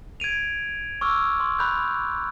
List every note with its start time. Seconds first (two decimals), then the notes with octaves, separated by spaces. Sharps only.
0.20 G#6 D7 D#7 F7
1.01 C#6 D6 E6 F6
1.40 C6
1.59 B5 F#6 G6